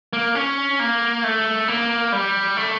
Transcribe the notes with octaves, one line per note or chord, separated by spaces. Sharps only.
A#3
C#4
A#3
A3
A#3
G3
A3